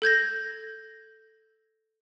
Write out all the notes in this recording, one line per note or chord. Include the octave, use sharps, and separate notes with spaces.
A4 G6 G#6 A#6